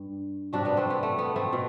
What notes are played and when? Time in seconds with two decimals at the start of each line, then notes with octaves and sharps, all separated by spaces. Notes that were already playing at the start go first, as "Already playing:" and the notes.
Already playing: G2
0.53 C3 G3 D4 F#4
0.65 B3 D4
0.77 A3 C4
0.90 B3
1.03 A3
1.18 B3
1.36 A3 C4
1.53 B2